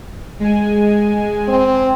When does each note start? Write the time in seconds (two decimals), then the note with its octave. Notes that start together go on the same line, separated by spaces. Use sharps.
0.40 G#3 G#5
1.48 C4